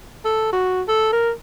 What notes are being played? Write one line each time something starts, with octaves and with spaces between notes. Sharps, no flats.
A4
F#4
A4
A#4